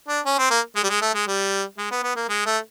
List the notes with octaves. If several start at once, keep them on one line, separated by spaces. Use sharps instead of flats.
D4
C#4
C4
A#3
G#3
G3
G#3
A3
G#3
G3
G#3
B3
B3
A#3
G#3
A3